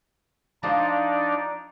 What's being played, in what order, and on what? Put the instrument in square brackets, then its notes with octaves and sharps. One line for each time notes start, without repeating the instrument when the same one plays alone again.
[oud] F3 F4 C5 [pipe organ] D4 D#4 D5